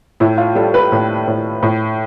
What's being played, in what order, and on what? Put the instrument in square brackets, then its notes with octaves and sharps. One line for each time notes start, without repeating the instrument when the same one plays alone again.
[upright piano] A2 E4
F4
G3 A4
B4
A2
A2
A2